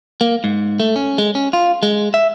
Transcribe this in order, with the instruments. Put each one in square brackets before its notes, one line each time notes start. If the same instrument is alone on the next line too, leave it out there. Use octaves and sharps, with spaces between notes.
[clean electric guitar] A#3
G#2
A3
C#4
G#3
C#4
F4
G#3
E5